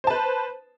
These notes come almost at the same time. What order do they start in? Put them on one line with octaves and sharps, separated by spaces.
C5 A5 B4